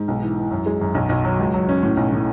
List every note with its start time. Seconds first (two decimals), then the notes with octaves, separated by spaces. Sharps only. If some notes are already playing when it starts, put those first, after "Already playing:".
Already playing: G#2
0.08 B1
0.22 E3
0.37 E3
0.51 F#2
0.66 G#3
0.81 F#2
0.95 B1
1.09 B1
1.24 F#3
1.39 C#2
1.54 F#3
1.69 C#4
1.83 A2
1.97 B1
2.12 A2